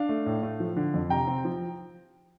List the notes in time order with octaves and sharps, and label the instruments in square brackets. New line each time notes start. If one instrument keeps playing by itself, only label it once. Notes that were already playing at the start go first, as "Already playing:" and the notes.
Already playing: [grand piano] D4 F5
A3
A2
A3
F3
D3
F2
C3 G5 A#5
C4
F3